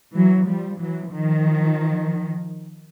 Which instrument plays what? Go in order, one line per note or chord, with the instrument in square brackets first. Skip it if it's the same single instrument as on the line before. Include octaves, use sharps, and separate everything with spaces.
[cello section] E3 F#3
F3 G3
E3 F#3
D#3 F3